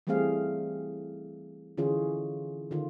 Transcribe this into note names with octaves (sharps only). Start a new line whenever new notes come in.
E3 G3 A3 C4 G#4 F5
D3 E3 C#4 F4 G#4
D3 D#3 F4